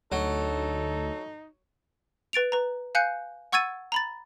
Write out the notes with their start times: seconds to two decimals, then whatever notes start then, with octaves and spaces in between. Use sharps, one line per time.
0.12 D2 F#3 D#4 A4
2.33 B4 A6 D7 F7
2.52 B4 A#5
2.95 F5 G#5 F#6 G6 C#7
3.52 F#5 C#6 E6 G#6 A6 D#7
3.92 A#5 B5 A6